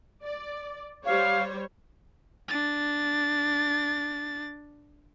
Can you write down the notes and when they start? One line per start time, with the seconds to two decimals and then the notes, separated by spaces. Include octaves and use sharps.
0.24 D5
1.05 G3 C5 C#5 F5
2.48 D4 A6